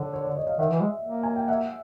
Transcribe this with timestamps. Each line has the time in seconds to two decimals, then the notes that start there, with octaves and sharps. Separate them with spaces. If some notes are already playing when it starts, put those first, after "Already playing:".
Already playing: D3 C#5
0.13 C#5
0.24 D5
0.36 C#5 D#5
0.47 D#5 F5
0.58 D#3 E5 F#5
0.70 E3
0.81 G#3
1.03 A#3
1.23 G#5
1.36 G5
1.48 E5 F#5